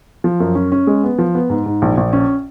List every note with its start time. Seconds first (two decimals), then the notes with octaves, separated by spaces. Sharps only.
0.24 F3
0.40 F#2
0.55 C#4
0.72 C#4
0.87 G#3
1.04 B3
1.19 F3
1.35 B3
1.50 G#2
1.66 G#2
1.82 A#1
1.97 A#1
2.13 C#4